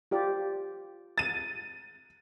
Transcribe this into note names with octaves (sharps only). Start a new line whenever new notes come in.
F4 G4 D5
A6 D#7